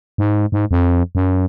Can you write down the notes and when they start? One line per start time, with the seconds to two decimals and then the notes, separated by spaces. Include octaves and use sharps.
0.18 G#2
0.52 G#2
0.71 F2
1.15 F#2